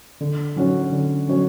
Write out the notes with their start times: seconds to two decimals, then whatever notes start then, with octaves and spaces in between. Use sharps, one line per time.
0.21 D3
0.56 F#3 C#4 F#4 C#5
0.92 D3
1.28 F#3 C#4 F#4 C#5